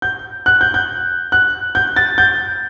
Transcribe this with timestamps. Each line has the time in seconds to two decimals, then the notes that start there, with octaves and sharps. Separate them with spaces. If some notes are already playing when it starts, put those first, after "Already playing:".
0.02 G6
0.46 F#6
0.61 G6
0.74 G6
1.32 F#6
1.75 G6
1.96 A6
2.18 G6